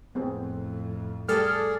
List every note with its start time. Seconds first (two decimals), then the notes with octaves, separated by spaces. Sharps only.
0.15 F2 A2 B3 C4 G#4
1.29 G3 A3 G#4 A4 D5 F6